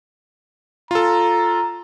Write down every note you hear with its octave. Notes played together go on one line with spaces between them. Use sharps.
F4 A4 A#5